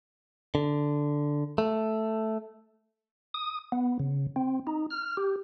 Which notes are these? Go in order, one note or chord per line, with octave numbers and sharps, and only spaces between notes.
D3
A3
D#6
B3
C#3
C4
D#4
F6
G4